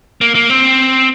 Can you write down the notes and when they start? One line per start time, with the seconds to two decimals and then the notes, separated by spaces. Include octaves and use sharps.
0.21 A#3
0.35 A#3
0.50 C4